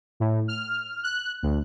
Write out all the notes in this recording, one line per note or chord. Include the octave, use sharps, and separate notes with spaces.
A2
F6
F#6
D2